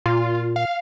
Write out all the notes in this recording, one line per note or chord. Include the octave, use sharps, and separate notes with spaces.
A#2 F4
F5